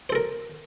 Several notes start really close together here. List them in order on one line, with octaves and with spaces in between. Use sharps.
C5 A4 A#4